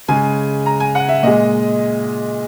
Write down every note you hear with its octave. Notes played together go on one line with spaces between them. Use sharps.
C#3 G#3 G#5
A#5
G#5
F#5
E5
A#2 G#3 D#5